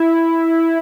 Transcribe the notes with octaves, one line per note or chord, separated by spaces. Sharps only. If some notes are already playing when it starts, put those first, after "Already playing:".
Already playing: E4